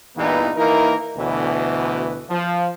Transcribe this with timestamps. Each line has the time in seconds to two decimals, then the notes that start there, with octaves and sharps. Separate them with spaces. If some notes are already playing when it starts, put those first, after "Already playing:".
0.16 E2 G2 A#2 E3 B3 D#4
0.56 E3 A#3 D#4 E4 A#4
1.16 D2 B2 E3
2.29 F3